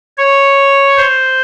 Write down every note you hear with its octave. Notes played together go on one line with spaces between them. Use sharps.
C#5
C5